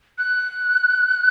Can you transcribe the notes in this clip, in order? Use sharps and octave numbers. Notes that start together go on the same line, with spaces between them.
F#6